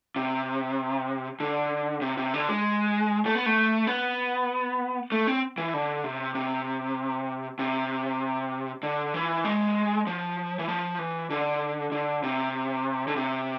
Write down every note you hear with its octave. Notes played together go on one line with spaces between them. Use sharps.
C3
D3
C3
C3
D3
G#3
A3
B3
A3
B3
A3
C4
E3
D3
C3
C3
C3
D3
E3
G#3
F3
E3
F3
E3
D3
D3
C3
D3
C3